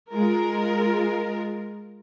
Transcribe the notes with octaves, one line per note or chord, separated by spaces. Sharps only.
G#3 F4 A#4